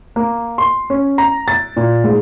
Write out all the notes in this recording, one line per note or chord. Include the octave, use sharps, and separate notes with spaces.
A#3
C6
C#4
A#5
A6
A#2
G#2